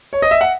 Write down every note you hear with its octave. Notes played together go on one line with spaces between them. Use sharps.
C#5
D#5
E5
F#5